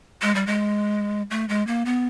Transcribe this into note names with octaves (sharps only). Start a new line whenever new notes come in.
G#3
G3
G#3
A3
G#3
A#3
B3